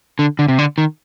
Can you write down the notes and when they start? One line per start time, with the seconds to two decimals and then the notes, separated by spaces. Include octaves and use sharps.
0.19 D3
0.39 D3
0.48 C3
0.59 D3
0.78 D#3